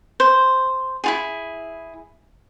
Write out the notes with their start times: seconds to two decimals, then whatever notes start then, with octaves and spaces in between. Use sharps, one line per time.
0.20 C5
1.04 E4 F4 G#4